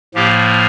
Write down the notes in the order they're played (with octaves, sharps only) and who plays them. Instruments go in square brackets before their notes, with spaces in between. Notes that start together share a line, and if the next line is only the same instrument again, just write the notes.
[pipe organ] A2 F3 A#3 G4